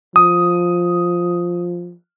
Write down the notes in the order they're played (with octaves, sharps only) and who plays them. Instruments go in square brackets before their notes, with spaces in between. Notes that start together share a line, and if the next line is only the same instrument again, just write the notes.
[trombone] F3 [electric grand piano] D#6